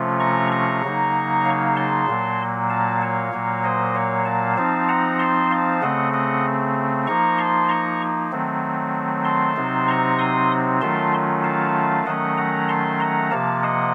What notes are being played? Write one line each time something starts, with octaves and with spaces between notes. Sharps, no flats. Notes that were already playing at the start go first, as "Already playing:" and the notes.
Already playing: C3 F3 A3 C#4 F4
A#5 C#6
A#5 C#6
C#3 F#3 A#3 D#4
C#5 F5
A5 C6
A#2 F#3 A#3
F5 A5
C#5 F5
A#2 F#3 A#3
C5 D#5
C#5 F5
F5 A5
F3 C4 D#4 F5 A5
F#5 A#5
A5 C6
F5 A5
C#3 A3 C4 D#5 F#5
D#5 F#5
F3 A#3 D#4 A#5 C#6
A5 C6
A#5 C#6
D#3 F#3 A3 C4
A5 C6
C3 F#3 C4 D#4
A#5 C#6
C6 D#6
D#3 F#3 A3 C#4 F4 A5 C6
F5 A5
D#3 F#3 A3 C#4 D#5 F#5
F#5 A#5
A5 C6
F#5 A#5
C3 F3 A#3 F5 A5
D#5 F#5